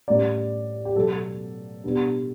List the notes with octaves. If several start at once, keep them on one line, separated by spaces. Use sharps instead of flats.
A2 G3 C#4 D5
G4
B2 F#3 B3 A4
B2 G3 B3 D4